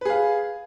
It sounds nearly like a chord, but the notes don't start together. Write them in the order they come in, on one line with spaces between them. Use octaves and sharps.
B4 G#4 F5